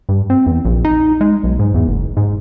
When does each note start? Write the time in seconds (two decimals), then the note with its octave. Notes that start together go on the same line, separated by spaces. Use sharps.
0.09 G2
0.30 C4
0.46 E2
0.65 A#1
0.85 D#4
1.21 G#3
1.44 B1
1.59 G#2
1.74 E2
1.88 F#1
2.17 G#2